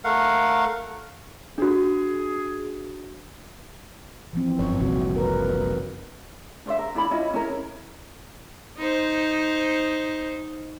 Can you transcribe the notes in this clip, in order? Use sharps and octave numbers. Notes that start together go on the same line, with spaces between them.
A3 A#4 F5 F#5
D4 F#4 G#4
E3 F3 C4
G1 F#2 C#4 C#5
F#1 C2 A#2 C4 F#4
A#4 B4
D4 C5 C#5 E5
A#4
D4 E4 D5 B5
C#4 E4 F4 D#5
C#4 E4 A#4
D#4 C5